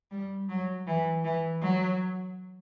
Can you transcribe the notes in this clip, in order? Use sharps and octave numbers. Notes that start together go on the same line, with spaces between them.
G3
F#3
E3
E3
F#3